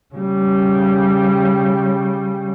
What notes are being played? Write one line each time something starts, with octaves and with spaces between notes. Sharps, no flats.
C#3 G3